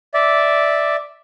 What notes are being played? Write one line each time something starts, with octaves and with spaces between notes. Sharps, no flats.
D5 E5